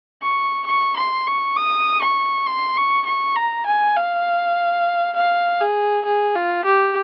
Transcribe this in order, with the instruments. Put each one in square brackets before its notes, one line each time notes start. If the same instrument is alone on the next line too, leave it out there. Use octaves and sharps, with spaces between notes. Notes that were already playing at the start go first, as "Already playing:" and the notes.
[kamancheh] C#6
C#6
C6
C#6
D#6
C#6
C6
C#6
C#6
A#5
G#5
F5
F5
G#4
G#4
F4
G4